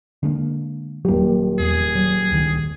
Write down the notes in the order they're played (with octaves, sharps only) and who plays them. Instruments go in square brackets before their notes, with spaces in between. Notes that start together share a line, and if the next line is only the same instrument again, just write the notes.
[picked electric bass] D3 G#3 A#3
[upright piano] D#1 G4 [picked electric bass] F#3 A#3
[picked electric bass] E2 [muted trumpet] G#4
[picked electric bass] F#3
C#2 D#3